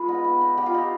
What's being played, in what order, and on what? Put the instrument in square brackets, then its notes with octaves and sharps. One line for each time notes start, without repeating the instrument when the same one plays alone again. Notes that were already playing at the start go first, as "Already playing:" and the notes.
Already playing: [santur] G#3 F4 B4
B3 D#4
B3
D#4
B3 G4
F4
D#4 G4